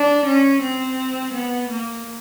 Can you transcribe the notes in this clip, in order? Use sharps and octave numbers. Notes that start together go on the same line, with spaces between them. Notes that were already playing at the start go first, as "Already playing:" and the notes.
Already playing: D4
C#4
C4
B3
A#3